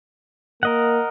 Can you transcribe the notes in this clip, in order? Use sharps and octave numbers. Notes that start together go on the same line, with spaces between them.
A#3 A#4 D#5 F#5